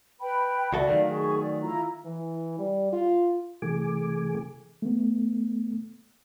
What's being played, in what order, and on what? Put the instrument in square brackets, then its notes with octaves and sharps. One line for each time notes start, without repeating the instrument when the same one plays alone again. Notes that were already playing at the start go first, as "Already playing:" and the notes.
[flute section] B4 G5 B5
[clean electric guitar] C#2 F#4 A4 [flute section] D5 E5
[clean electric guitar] D#3 F#3 A3 [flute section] D5 F5
[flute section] D#4 G#4 C#6
D5
E4 F4 A#5
[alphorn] E3
G3
F4
[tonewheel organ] C3 E3 A3 G#4 G#5 D6
[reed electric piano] A3 B3